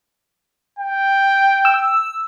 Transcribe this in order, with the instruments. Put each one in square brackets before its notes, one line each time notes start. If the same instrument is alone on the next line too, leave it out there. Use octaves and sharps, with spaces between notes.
[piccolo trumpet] G5
[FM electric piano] E6